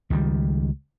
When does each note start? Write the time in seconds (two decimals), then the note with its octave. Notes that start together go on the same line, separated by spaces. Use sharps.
0.10 C#2 D#3 E3 G3